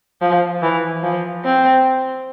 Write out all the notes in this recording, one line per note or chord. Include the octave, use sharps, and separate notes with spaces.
F3
E3
F3
C4